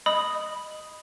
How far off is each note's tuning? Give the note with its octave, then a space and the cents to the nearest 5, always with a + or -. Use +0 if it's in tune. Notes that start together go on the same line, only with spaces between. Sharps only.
D#5 -10 B5 +0 D#6 +0